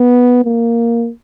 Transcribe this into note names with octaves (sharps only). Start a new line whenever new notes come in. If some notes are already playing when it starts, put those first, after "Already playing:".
Already playing: B3
A#3